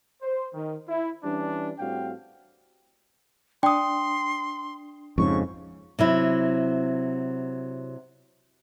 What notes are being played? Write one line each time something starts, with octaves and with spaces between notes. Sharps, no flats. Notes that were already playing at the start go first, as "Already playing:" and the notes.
C5
D#3
E4
E3 G3 C#4 D4
A2 G3 C4 F#4 F5 G5
D4 G5 C6 D#6
F2 G#2 C#3 C#6
C3 F#3 E4